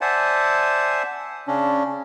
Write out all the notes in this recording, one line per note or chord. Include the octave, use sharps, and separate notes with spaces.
C5 D5 E5 F#5 G#5 A5
C#3 C#4 D4